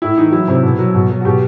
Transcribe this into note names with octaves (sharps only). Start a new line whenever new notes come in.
A2 E4
E3 D#4
F#3 E4
C3
B2
F#3
B2
F#3
F#4
B2 G4